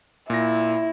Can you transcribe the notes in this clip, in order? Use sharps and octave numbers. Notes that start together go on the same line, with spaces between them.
A#2 E4 A#6